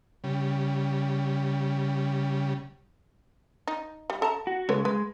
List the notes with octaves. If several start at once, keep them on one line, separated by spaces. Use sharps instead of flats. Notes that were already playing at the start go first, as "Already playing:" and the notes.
C#3 G3
D#4
G3
A4 A5 A#5
F#4
C#3 G#3 A4 B4 C#5
G#3 B4